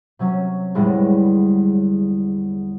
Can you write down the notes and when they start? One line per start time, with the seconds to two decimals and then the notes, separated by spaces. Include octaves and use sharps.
0.19 C3 F#3 C#4
0.75 E2 A2 D3 G3 G#3